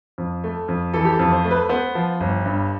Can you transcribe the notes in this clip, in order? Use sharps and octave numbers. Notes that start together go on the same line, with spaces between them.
F2
A3
F2
E3 A4
G4
A4
F2
C5
A3
B4
B3 C5
F3
G1
G2